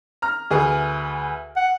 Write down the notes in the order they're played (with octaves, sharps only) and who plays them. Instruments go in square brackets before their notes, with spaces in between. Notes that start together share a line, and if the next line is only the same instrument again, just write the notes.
[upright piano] A#5 F6
D2 G#4 B4
[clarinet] F#5